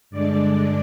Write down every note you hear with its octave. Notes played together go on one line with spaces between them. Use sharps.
G2 D3 G#3 D4 D5